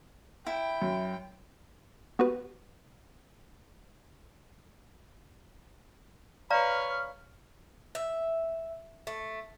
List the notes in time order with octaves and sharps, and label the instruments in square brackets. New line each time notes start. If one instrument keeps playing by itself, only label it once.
[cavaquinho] E4 [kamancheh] G5
[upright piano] F#2
[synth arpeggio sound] B3 F#4 G4 B4
[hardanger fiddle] B4 C#5 [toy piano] D5 F5 A#5 [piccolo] F6
[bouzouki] E5
A3